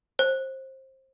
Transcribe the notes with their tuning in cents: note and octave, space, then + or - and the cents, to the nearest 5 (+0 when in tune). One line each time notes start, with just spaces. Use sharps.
C5 +20